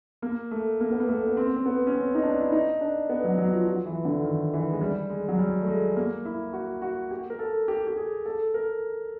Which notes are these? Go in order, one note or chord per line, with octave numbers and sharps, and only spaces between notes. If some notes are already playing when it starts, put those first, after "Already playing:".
A#3
A3
A#3
B3
A#3
A3
B3
C4
C4
B3
C#4
C4
D#4
D4
E4
D#4
D4
B3
F#3
F#3
F3
F3
E3
D3
D#3
E3
G#3
G3
G#3
F#3
G3
A3
G#3
A#3
E4
F#4
F#4
G4
A#4
A4
G4
G4
G#4
A4
A#4